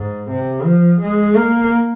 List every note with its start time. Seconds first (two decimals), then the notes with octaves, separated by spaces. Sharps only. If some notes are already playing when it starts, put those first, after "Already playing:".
Already playing: G#2
0.30 C3
0.65 F3
1.01 G#3
1.36 A#3